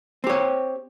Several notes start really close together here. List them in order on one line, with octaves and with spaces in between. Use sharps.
C4 G4 C#5